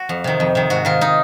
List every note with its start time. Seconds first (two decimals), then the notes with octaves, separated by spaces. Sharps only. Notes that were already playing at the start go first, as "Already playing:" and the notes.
Already playing: F#4
0.09 F2
0.24 C3 D#3
0.40 F2
0.55 C3 D#3
0.70 G#2 F#4
0.85 D#3 F4
1.01 D#4